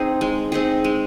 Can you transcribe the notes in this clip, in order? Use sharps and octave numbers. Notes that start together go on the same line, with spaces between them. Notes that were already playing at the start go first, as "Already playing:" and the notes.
Already playing: C4 D#4 G#4
G#3
C4 D#4 G#4
G#3